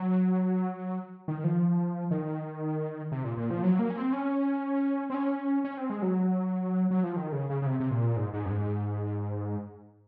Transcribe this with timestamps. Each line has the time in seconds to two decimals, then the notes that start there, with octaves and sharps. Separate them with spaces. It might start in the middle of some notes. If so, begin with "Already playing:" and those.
Already playing: F#3
1.28 D#3
1.44 F3
2.11 D#3
3.12 C3
3.24 A#2
3.37 A#2
3.51 F3
3.63 F#3
3.79 A#3
3.90 C#4
3.97 C4
4.13 C#4
5.10 C4
5.14 C#4
5.64 C#4
5.77 C4
5.90 G#3
6.02 F#3
6.91 F#3
7.04 F3
7.16 D#3
7.32 C#3
7.50 C#3
7.62 C#3
7.66 C3
7.80 C3
7.91 A#2
8.17 G#2
8.33 G#2
8.46 F#2
8.50 G#2